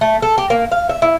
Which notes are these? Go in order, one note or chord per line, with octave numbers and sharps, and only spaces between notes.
A3
A4
G4
A#3
F5
E5
E4